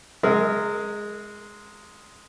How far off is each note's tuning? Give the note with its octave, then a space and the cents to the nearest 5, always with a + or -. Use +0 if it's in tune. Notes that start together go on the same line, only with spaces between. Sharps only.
G#3 +0 A#4 -20 E5 -35